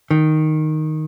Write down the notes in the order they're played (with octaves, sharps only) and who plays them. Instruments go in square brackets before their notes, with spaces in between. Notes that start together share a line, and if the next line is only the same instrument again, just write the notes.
[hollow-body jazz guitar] D#3